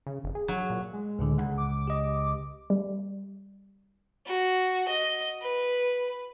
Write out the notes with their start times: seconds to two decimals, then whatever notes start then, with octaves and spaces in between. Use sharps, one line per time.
0.07 C#3
0.24 F1
0.35 G#4
0.48 F#3
0.70 A#2
0.93 G#3
1.19 C#2 A2 D3
1.38 C#2 F#5
1.58 D6
1.88 G4 D#5
2.70 G3
4.26 F#4
4.88 D#5
5.41 B4